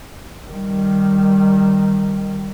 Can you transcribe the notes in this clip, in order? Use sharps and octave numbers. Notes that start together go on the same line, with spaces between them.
D#3 G3